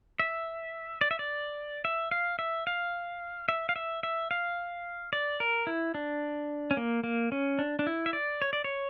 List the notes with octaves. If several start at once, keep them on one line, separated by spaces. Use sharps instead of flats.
E5
D5
E5
D5
E5
F5
E5
F5
E5
F5
E5
E5
F5
D5
A#4
E4
D4
C#4
A#3
A#3
C#4
D4
D4
E4
E5
D5
C#5
D5
C#5